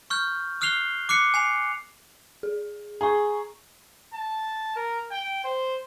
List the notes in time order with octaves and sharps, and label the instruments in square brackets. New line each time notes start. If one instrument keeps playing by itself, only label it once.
[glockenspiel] C#6 F6 G6
D#6 F6 F#6 C7 F7 G7
D6 F#6 C7 C#7
G#5 C7 F7
[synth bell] G#4
[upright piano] G#4 [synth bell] A#5 C#6
[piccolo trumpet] A5
A#4
G5
C5